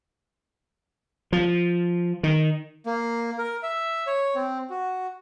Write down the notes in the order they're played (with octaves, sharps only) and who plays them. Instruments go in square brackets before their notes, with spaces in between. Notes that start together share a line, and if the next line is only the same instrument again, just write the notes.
[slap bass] F3
D#3
[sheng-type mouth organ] A#3
A#4
E5
C#5
C4
F#4